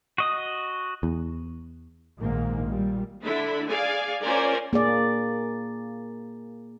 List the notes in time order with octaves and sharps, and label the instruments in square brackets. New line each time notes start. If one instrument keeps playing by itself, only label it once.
[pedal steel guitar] F#4 D#5 D#6
[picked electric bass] E2
[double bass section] A#1 G#2 D#3 G#3 A#3
A#2 G3
[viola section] D3 D4 E4 B5
G#4 D5 F5 G#5
C#4 F4 A#4 C5 D5 G#5
[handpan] A#3 G#4 D5